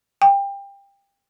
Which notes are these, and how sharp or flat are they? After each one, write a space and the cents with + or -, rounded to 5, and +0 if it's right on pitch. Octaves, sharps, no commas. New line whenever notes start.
G5 +25